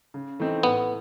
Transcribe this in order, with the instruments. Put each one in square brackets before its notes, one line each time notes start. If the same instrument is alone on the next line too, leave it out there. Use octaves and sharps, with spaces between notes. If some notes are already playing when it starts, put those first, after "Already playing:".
[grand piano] C#3
E3 A3 C4 D#4
[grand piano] A2 [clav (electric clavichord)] B3